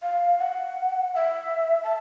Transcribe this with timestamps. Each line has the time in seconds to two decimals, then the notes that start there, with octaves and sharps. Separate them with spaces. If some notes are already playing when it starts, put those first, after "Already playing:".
0.02 F5
0.39 F#5
1.15 E5
1.84 A5